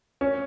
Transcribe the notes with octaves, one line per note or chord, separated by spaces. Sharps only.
C#4